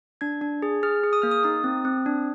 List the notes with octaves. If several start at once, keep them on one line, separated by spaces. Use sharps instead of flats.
D4 G#6
D4
G#4
G#4 F6
G#4
D#6
A#3 F6
D#6
D#4 D#6
C4
C4
D4